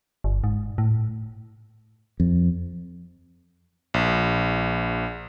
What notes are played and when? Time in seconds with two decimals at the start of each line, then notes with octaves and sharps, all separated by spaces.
0.24 G1
0.44 G#2
0.78 A2
2.20 F2
3.94 A#1